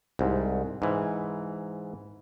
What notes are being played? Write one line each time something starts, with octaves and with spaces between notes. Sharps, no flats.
C2 G#2
G#2 E3